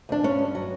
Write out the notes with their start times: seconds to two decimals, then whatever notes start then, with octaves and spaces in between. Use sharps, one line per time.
0.09 D2 D4
0.23 G2 C#4
0.39 G2
0.55 F#3